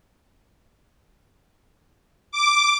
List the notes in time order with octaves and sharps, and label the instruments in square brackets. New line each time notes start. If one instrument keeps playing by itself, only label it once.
[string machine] D6